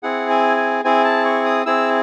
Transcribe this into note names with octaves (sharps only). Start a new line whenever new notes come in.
C4 E4 G#4 F#5
G#5
G#5
C4 E4 G#4 G#5
A5
C#6
D#6
C4 E4 G#4 E6